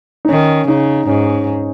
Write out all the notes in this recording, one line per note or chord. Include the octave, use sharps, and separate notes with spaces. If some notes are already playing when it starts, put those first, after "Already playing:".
D#4
D#3 C#4
C#3 D#4
G#2 C#4